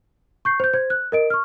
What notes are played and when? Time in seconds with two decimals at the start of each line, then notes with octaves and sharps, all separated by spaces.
0.45 C#6 G6 C7
0.60 C5 G6
0.74 C5 G#6
0.90 F#6
1.12 A#4 D#5 D7
1.30 C#6 F6